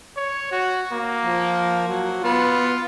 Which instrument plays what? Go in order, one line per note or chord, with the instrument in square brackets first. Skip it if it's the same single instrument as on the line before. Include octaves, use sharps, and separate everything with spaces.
[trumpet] C#5
F#4
A#3
[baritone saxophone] F3
F#3
[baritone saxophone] B3 [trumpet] F4